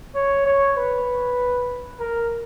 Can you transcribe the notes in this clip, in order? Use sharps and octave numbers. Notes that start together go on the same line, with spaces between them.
C#5
C#5
B4
A#4